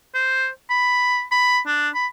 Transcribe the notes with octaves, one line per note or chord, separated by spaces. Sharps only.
C5
B5
B5
D4
B5